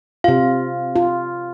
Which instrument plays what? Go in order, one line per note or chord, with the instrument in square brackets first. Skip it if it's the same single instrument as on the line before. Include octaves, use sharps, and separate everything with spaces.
[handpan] C3 F4 [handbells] F5
[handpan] F4